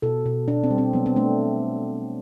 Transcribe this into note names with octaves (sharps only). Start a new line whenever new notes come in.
B2 A4
B2
B2 D4
C4
G3
C4
F#3 B3
C4
A3 D4